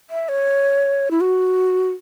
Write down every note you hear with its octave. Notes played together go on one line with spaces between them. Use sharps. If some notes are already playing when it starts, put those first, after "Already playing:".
E5
C#5
E4
F#4